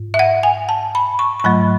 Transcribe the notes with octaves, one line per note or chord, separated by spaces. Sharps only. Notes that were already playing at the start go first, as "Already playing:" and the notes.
Already playing: G#2
E5
F#5
G#5
A5
B5
C#6
C#6
G#2 F#3 A3 B5